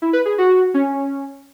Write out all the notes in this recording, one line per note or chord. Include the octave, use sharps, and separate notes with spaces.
E4
B4
G#4
F#4
C#4